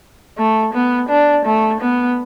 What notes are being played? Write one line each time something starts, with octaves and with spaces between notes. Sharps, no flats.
A3
B3
D4
A3
B3